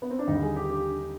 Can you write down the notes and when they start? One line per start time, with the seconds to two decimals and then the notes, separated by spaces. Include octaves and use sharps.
0.02 B3
0.11 C4
0.19 D4
0.27 D#2 D3 G3 D#4
0.42 G#4
0.56 G4
0.70 G4